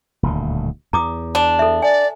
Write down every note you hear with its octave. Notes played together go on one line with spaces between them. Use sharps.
D#1 D2 A2
E2 A#5 D6 D#6
D4
A4 E5
D5 G#5